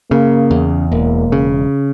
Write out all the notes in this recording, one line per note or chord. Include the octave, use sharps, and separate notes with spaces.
C#3 A#3
E2
E1 A#3
C#3